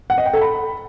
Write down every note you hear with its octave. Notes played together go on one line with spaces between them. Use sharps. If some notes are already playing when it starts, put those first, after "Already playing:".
F#5
D#5
G5
A4
B5